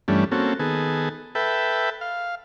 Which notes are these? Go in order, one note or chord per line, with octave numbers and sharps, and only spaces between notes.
G2 E3 G3 A3 C#4 D4
A#3 C4 C#4 F#4 A4
D#3 B3 G#4 A4
A4 B4 E5 G5
F5